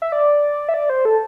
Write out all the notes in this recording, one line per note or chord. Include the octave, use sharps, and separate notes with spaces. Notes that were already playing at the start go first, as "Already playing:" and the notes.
E5
D5
E5
D5
C5
A4